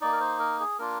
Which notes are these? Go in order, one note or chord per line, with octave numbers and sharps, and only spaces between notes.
A#3 D#4 D5
A#4
C5
A#4
G#4
A#3 D4 F4 A#4